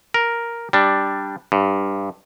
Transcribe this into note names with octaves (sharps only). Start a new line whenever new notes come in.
A#4
G3 D4
G2